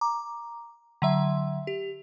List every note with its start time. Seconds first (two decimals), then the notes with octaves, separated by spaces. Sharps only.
0.01 A#5 D6
1.02 D3 F#3 E5
1.67 G4